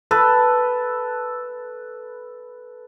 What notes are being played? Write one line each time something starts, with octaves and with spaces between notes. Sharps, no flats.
A4 B4